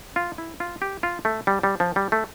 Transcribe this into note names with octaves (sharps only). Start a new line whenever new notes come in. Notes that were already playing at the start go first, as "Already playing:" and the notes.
F4
E4
F4
G4
F4
A3
G3
G3
F3
G3
A3